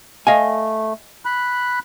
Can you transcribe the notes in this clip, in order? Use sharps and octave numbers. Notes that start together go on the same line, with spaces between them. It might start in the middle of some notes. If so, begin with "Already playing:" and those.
A3 D#5 F5 G#5
B5 F#6